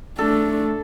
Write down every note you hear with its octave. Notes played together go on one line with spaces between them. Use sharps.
A3 D4 A4